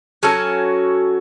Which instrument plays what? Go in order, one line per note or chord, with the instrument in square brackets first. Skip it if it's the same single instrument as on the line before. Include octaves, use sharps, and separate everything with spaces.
[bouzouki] F#3 C#4 F#4 A4